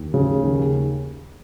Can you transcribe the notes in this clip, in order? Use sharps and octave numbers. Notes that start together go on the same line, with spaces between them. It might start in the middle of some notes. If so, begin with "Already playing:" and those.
Already playing: D#2
C#3
D#2